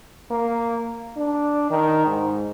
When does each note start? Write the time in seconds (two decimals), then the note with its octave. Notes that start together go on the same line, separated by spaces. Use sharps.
0.31 A#3
1.17 D4
1.70 D#3
2.06 G#2